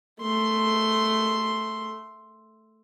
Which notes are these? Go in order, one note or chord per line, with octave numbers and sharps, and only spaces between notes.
A3 C6